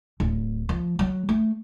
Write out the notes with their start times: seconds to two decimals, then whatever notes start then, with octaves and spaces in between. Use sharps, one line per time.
0.20 D1
0.69 F3
0.99 F#3
1.29 A3